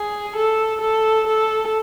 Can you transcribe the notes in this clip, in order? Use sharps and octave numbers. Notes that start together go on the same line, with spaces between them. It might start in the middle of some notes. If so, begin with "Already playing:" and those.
Already playing: G#4
A4
A4
A4